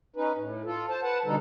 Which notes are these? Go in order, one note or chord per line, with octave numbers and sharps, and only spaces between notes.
C#4 D#4 B4
A2
F4 A4
C5 A5
B4 F#5 A5
B2 D3 G3 D#4 A4